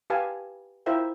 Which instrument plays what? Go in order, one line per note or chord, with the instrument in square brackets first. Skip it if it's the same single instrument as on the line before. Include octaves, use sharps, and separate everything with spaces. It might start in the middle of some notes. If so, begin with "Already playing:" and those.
[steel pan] G4 B4 F5 G#5 A5
E4 F4 A#4 C5 E5 G5